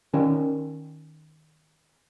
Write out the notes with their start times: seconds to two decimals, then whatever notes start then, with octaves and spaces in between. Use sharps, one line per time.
0.13 D#3 C#4